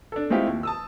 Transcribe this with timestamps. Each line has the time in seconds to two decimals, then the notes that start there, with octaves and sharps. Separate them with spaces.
0.12 D4 A4
0.30 G#3 A3 C4 E4 F4 G4
0.47 D#2
0.63 A5 D#6 E6